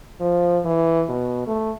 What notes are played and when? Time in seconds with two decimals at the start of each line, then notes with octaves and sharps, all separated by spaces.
0.20 F3
0.65 E3
1.09 B2
1.47 A3